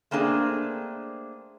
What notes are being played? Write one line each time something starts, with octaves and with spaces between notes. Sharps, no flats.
A3 A#3 C4 D4 G#4